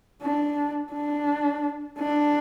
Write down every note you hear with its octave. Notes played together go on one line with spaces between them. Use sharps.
D4
D4
D4